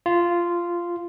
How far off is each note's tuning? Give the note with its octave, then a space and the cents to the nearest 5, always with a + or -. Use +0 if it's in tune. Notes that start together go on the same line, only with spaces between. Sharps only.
F4 -10